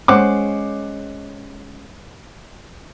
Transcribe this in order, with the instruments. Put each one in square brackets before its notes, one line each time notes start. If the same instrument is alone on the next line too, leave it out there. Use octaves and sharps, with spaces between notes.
[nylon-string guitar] G#3 C#4 [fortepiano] C5 F#5 D6